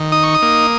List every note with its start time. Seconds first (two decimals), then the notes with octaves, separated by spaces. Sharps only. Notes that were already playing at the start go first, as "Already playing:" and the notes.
Already playing: D#3
0.12 D#4 D#6
0.23 C#6
0.35 D#6
0.42 A#3